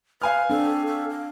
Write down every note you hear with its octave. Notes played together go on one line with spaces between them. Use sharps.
B4 F5 G#5 F6
C4 D4 A4
A4
F5